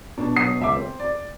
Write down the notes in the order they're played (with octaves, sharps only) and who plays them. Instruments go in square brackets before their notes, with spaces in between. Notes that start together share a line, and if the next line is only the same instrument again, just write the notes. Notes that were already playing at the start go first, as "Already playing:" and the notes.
[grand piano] B2 D4
B2 F#3 F#5 D#6 C7
C#2 E5 D6
C4
D5